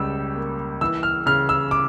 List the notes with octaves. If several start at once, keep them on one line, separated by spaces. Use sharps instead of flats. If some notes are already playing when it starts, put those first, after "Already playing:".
Already playing: C#2 C#3 G3 E6
A#3
E3 E6
F6
C#3 F6
E6
D6